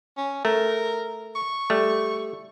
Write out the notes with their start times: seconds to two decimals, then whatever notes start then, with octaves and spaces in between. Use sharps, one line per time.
0.18 C#4
0.45 A3 A#4
1.36 C#6
1.70 G3 A3